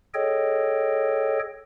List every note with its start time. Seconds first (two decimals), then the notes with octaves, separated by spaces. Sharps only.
0.14 G#4 A4 C#5 D#5 G5